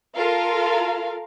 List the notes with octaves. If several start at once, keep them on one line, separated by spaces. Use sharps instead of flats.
F4 A4 A#4 F5